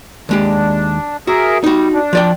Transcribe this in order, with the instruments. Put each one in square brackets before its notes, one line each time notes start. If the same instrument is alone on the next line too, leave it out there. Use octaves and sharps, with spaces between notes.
[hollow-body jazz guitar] D#2 G#3 G4 [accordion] D4
[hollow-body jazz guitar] F#4 [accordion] G#4 A#4 E5
[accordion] G3 [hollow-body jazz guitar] D#4 F#4
[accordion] D4
[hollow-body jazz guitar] F3 D5 G5